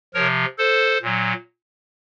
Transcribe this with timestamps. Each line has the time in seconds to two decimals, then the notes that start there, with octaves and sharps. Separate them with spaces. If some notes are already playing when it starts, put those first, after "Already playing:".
0.14 C3 F3 A#4 C#5
0.58 A4 C5
1.02 A#2 F#3